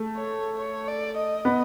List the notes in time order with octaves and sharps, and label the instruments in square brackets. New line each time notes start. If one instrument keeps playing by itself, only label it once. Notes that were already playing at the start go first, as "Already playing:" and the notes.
Already playing: [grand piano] A3
[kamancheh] C#5
C#5
D5
D#5
[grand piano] B3